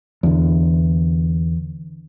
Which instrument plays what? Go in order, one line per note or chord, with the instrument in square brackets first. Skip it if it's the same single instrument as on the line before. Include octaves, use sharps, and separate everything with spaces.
[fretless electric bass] E2 D3